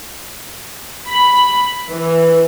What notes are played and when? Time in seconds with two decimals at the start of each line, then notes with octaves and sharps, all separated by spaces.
1.09 B5
1.90 E3